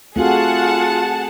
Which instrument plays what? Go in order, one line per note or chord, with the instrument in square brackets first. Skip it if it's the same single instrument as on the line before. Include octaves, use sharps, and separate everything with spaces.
[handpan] A3 C4 F#4 [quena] F4 [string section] G#4 F#5 A5